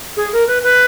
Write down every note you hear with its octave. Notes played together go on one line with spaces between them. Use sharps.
G#4
A#4
B4
B4